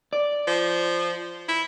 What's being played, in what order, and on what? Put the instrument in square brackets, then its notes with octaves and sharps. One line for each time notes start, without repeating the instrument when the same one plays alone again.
[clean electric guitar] D5
[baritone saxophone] F3
E4